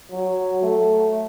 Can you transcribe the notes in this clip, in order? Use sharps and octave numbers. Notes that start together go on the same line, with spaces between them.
F#3
A3